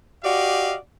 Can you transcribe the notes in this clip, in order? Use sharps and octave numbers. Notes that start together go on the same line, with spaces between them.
F#4 G4 D5 D#5 F5